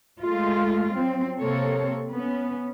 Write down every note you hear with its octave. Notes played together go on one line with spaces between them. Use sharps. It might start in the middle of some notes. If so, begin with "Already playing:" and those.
G#3 A3 F4
F#3 C4
C3 A#3 C4 A4 C#5
B3 C#4